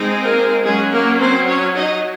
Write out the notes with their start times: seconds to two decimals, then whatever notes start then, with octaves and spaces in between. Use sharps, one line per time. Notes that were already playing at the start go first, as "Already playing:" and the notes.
Already playing: G#3 C4 D#4
0.22 A#3 A#4
0.63 F#3 G#3 C#4 G#4
0.91 A#3 A#4
1.20 C4 C5
1.48 C#4 C#5
1.76 D#4 D#5